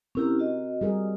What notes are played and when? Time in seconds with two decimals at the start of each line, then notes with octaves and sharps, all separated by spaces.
0.15 C4 C#4 E4 G4 A#4
0.39 F#4 D#5
0.81 G3 G#4 A#4